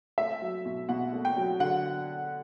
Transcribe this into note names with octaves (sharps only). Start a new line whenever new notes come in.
A3 E5
F#3
B2
B2 F#5
A3
G5
F#3
D3 F#5